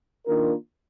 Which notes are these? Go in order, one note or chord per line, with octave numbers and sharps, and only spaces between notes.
D#3 A#3 D4 F4 A#4